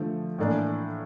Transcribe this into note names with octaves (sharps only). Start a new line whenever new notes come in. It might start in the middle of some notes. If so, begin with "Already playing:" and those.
Already playing: D3 F3 A3
A2 E3 A#3 D4